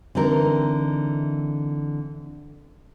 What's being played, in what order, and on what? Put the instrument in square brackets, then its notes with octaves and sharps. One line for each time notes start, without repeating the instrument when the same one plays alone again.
[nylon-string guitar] D3 E3 C4 D#4 A#4